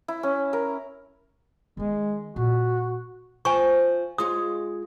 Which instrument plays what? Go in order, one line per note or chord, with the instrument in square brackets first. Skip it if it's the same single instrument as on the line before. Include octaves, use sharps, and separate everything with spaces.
[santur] E4
C#4
A#4
[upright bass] D#3 C#4 [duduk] G#3
[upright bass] A#2 [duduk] F#4
[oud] F3 [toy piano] G#5 C#6
[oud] G#3 F4 C#5 [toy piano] D#6